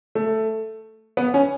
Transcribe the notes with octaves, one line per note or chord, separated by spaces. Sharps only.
A3
B3
C#4